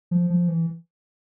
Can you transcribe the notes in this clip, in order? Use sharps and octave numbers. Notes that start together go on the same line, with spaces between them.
F3
F3
E3